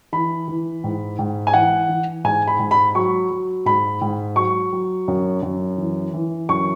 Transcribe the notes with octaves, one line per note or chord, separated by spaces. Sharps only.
E3 B5
E3
G#2
G#2
G#5
E3 F#5
E3
G#2 G#5
B5
G#2
B5
F#3 C#6
F#3
G#2 B5
G#2
F#3 C#6
F#3
F#2
F#2
E3
E3
F#2 C#6